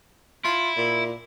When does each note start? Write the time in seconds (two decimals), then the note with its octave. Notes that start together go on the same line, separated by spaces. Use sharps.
0.45 E4 F4
0.77 A#2